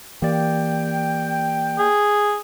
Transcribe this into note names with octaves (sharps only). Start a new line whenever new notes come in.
E3 A#3 G4 D5 G5
G#4